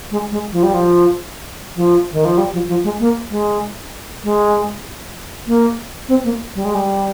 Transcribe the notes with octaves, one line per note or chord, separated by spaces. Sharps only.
G#3
G#3
F3
G3
F3
F3
D#3
F3
G3
F3
F3
G#3
A#3
G#3
G#3
A#3
C4
A#3
G3
G#3
G3